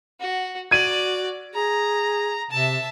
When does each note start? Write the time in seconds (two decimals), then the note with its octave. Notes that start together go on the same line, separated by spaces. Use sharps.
0.20 F#4
0.71 F#4 D5 G#6 D#7
1.54 G#4 A#5
2.51 C3 E5 A5